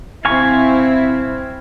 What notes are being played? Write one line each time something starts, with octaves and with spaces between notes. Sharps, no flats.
D#1 C4 E4 F5 G#5 C#6